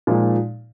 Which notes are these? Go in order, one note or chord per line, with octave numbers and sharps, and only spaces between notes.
A#2 F3 G#3 D#4